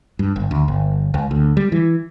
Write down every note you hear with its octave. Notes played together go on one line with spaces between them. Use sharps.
G2
G1
D2
G1
C#2
D2
G3
E3